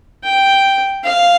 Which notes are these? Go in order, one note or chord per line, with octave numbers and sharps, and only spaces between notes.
G5
F5